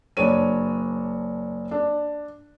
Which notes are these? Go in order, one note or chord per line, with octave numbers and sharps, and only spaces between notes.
F#1 D4 C#5 D#7
D4